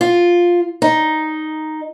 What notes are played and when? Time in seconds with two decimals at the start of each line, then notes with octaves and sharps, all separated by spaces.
0.01 F4
0.82 D#4